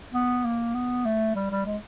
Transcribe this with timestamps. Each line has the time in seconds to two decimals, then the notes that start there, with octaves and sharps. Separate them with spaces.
0.14 B3
0.45 A#3
0.74 B3
1.05 A3
1.36 G3
1.51 G3
1.66 G#3